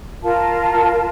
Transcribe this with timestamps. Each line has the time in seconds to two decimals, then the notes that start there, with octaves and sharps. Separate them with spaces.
0.23 F4 A#4 A5